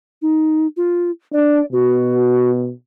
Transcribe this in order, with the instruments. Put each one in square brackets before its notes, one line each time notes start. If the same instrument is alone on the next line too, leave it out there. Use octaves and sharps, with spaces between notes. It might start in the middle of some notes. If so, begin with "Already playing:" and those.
[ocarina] D#4
F4
[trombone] D4 [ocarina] D5
[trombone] B2 [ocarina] F#4